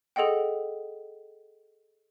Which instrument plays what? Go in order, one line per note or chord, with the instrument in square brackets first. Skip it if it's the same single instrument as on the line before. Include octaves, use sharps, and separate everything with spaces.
[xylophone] G#4 A4 D#5 F#5 G5